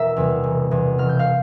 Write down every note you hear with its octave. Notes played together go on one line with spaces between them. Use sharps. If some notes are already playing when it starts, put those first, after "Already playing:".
Already playing: E1 A#4 E5 E6
E2 C3 G3
E1
E2 C3 G3
E1 F6
G6
F5 F6
C3